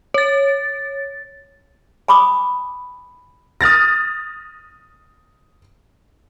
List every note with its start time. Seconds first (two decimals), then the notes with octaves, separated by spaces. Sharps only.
0.14 C#5 A6
2.08 G#5 B5 D6 D#6
3.61 D#6 F6 A6 A#6